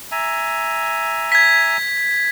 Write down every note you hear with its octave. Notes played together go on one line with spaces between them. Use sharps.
E5 G#5 A#5
G#6 B6